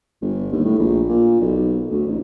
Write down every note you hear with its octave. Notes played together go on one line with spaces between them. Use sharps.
G1
D#2
A2
A#1
A#2
B1
D2
A1